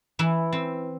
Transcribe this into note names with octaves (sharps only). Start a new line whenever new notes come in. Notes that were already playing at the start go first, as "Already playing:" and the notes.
E3 E4
C4